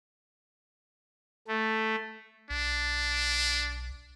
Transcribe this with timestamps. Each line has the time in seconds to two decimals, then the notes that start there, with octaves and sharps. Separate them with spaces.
1.48 A3
2.50 B1 D4